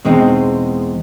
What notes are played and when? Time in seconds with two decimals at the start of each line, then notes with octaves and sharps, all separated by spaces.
0.05 E2 B2 G#3 C4 D#4